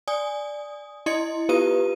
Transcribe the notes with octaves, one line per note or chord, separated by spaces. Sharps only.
D5 G#5 D#6
E4 D#5 C6 G#6 C#7
B3 F4 G4 B4 D#6 D#7